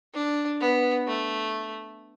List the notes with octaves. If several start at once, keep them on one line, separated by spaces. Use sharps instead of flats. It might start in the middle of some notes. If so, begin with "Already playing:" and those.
D4
B3
A3